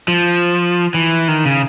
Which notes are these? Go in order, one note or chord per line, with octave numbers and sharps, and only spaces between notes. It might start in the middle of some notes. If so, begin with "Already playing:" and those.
F3
E3
D#3
C#3